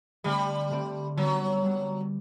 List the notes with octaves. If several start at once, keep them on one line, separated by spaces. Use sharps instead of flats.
D3 G3 A3 C4 G4 D5
D3 A3 C4 G4 D5
D3 F#3 G3 B3 D4
D3 G3 B3 D4